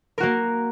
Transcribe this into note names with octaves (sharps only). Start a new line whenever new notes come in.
A#3 F#4 A#4